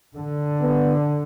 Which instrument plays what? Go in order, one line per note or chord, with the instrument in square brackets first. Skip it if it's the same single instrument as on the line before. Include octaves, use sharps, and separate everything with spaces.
[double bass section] D3
[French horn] B3